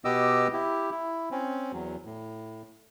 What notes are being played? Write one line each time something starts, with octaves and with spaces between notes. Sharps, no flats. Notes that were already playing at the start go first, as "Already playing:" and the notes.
B2 B3 G4 D#5 D6 E6
E4 G4
E4
C4 C#4
E2 F#3
A2